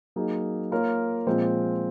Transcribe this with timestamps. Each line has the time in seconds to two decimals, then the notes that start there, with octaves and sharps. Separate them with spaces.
0.16 F#3 A#3 D#4 G#4
0.71 A#3 F4 A#4 C#5
1.27 A#2 F3 G#3 C4